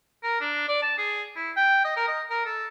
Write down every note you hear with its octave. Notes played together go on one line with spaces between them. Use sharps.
A#4
D4
D5
A5
G#4
E4
G5
D#5
A#4
D#5
A#4
A4